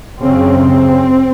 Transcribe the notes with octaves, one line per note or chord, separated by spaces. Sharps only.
F#2 C#3 C4